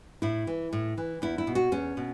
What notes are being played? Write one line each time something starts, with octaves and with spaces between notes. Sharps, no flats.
A2 E4
E3
A2
E3
E2 E4
E4
B2
F#4
E2 C#4
B2